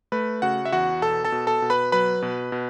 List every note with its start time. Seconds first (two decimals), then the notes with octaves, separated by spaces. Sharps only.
0.12 A3 B4 B5
0.42 C#3 F#4 F#5
0.65 E5
0.72 E2 F#4 F#5
1.02 B2 A4 A5
1.25 A4 A5
1.32 B2
1.47 A4 A5
1.62 B2
1.70 B4 B5
1.92 F#3 B4 B5
2.22 B2
2.52 B2